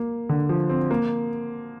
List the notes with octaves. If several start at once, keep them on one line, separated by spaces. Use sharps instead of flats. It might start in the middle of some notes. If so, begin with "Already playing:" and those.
Already playing: A#3
D3
F3
C4
A#3